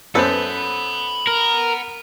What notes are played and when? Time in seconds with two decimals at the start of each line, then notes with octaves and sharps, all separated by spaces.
0.15 F#2 B3 A4 B4 C5 F#5 B5
1.27 A#4